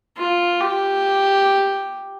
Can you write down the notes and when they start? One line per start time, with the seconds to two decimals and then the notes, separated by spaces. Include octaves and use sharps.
0.18 F4
0.60 G4